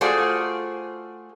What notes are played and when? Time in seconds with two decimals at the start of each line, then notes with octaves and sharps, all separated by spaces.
0.01 A3 F4 F#4 G#4 C5 D5